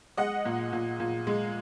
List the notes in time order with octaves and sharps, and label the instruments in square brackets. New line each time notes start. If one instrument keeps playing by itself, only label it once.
[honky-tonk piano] G#3 D#5 F#5
A#2
A#2
A#2
G#3